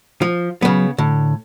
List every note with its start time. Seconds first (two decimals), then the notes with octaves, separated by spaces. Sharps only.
0.22 F3
0.62 C#3 F#3 B3
0.98 A2 D3